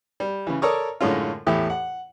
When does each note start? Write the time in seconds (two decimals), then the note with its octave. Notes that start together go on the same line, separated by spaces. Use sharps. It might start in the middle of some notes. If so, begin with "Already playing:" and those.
0.20 G3
0.47 C#3 E3
0.62 A4 A#4 C#5 D5 C#6 D#6
1.01 F#2 A2 D3 G#3 C#4 F4
1.47 E2 A2 E4 G4
1.70 F#5